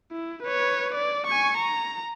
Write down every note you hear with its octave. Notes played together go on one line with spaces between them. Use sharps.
E4
B4 C#5
D5
G#5 C#6
A#5